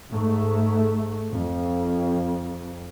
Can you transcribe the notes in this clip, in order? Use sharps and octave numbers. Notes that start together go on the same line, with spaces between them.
G#2 A3
F2